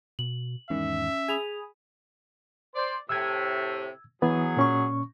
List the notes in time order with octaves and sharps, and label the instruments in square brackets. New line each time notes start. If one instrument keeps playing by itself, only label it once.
[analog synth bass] B2 [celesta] F#7
[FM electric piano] E2 G#2 D#3 [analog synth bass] C#4 [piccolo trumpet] E5
[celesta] G#4 F7 [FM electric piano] G#5 B5 D#6
[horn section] C5 D5
[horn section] A2 C3 [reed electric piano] E6 G#6
[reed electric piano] E3 B3 [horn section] F#3 G#4
[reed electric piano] A#2 C#4 C#6